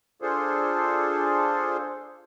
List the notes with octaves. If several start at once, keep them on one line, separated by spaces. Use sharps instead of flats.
D4 F4 G#4 A4 C5